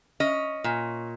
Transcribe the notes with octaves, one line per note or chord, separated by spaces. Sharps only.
C#4 D#5
A#2